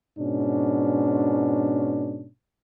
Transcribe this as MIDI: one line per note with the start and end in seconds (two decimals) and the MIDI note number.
0.18 2.27 44
0.18 2.27 47
0.18 2.27 61
0.18 2.27 62